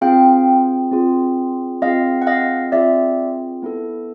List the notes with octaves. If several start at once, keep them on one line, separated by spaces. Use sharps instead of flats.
C4 F4 G#4 F5 G5
C4 F4 G#4
C4 F4 G#4 D#5 F5
F#5
D#5 F5
C4 F4 G#4 D5 E5
B3 E4 A4